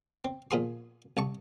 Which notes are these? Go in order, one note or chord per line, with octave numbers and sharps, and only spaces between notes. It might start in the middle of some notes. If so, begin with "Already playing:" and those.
C4
A#2 F3 G#4 C6
C2 A5 C#6